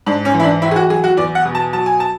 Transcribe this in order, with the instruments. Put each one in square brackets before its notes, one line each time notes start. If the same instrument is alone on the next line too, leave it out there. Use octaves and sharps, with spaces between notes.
[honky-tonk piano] G#2 D4
C#4
E3
E4
D4
A2 E4
G#4
F#4
F#3 G#4
F#4
E2 D5
F#5
B2
A5
F#3 A5
G#5
A5